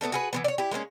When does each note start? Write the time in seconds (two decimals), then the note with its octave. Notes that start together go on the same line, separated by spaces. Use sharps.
0.01 A3 B3 D#4 A4
0.12 F#4 G#4 B4
0.33 E3 G#3 B3
0.44 C#5 D5
0.58 E4 G4
0.71 G#3 A#3 B3 C#4